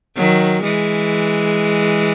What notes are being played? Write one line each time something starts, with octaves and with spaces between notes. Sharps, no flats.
D#3 F#3
E3 G#3